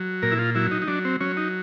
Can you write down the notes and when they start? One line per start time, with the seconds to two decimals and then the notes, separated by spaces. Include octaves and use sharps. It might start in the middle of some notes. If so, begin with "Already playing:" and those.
Already playing: F#3
0.22 A#2 A#4
0.32 E4
0.39 F4
0.55 F#3 E4
0.71 D#4
0.82 D#4
0.88 F#3 D4
1.05 C4
1.20 F#3 C#4
1.37 D#4